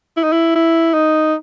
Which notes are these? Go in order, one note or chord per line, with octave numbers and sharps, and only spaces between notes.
E4
D#4
E4
E4
D#4